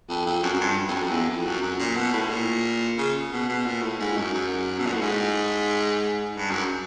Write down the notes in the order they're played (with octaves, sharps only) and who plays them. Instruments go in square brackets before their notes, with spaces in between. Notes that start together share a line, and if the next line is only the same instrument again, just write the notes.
[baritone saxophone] F2
F2
F#2
F#2
G2
F2
F#2
F2
E2
F2
F#2
F#2
A#2
B2
A2
A#2
C#3
B2
B2
A#2
A2
G#2
F#2
F#2
B2
A#2
A2
G#2
G2
F#2